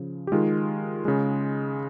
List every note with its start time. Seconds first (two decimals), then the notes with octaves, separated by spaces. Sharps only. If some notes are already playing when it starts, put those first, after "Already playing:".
Already playing: C#3 F3
0.27 G4
0.32 D#3 G#3 F4
1.05 C#3 G#3